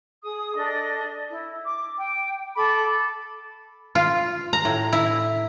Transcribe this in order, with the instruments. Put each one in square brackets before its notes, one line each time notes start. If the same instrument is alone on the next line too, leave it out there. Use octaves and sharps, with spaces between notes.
[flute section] G#4 D#6
D4 A4 D5 D#5
E4
D6
G5
A4 B5 D6
[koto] F4
A#5
A2
E4